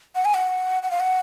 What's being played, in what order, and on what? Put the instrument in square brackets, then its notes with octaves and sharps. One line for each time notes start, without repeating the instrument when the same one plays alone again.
[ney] F#5
G#5
F#5
F#5
F5
F#5